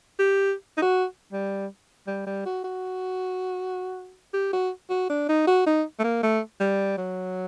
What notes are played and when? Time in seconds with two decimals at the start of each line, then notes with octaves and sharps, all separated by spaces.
0.19 G4
0.77 D#4
0.82 F#4
1.32 G3
2.07 G3
2.26 G3
2.46 F#4
2.64 F#4
4.33 G4
4.53 F#4
4.90 F#4
5.09 D4
5.29 D#4
5.47 F#4
5.66 D#4
5.99 A3
6.04 A#3
6.23 A3
6.60 G3
6.97 F#3